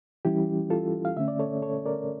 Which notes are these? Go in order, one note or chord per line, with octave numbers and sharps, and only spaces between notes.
E3 G3 C#4 E4 G4
F4 A4
F5
D3 A3 C#4 E5
D5
A4 C#5
A4 C#5
A#4 D5